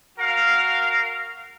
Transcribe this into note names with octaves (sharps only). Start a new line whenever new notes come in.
F#4 A#4 F5